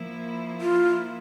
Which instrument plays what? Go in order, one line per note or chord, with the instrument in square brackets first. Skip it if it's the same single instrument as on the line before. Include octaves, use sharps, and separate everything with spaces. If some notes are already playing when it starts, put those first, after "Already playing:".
Already playing: [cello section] F3 A#3 E4
[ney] F4